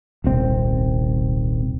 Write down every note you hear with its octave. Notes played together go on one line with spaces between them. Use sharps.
D#1 C2 C4